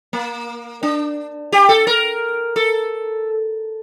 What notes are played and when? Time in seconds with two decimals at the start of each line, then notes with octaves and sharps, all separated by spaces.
0.13 A#3
0.83 D4
1.52 G4
1.69 A4
1.87 A#4
2.56 A4